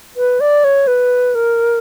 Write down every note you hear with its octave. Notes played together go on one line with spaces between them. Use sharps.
B4
D5
C#5
B4
A#4